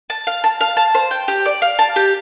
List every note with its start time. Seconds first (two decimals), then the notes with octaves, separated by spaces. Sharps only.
0.10 A5
0.27 F5
0.44 A5
0.61 F5
0.77 A5
0.95 C5
1.11 G5
1.28 G4
1.46 D5
1.62 F5
1.79 A5
1.96 G4